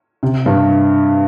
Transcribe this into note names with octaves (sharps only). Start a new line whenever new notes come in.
C3
G2